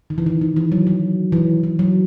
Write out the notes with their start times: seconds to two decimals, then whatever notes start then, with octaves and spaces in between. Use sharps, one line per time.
0.10 D#3
0.18 E3
0.26 D#3
0.41 D#3
0.56 E3
0.72 F#3
0.87 F#3
1.32 E3
1.63 E3
1.79 F#3